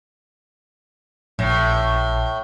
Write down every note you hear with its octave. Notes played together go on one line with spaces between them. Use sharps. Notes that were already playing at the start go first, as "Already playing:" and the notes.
A#1 A2